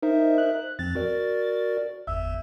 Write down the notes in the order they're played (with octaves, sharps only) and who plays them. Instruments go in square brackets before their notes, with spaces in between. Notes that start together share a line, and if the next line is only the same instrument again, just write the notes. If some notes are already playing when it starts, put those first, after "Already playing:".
[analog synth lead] D#4 [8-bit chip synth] A#4 C5 E5
[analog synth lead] F#6
[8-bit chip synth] F2 F3 C4 [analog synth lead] A6
[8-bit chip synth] F#4 A#4 D5
[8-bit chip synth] G1 E2 [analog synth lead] E5